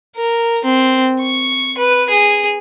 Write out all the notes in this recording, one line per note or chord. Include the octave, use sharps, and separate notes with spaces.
A#4
C4
C#6
B4
G#4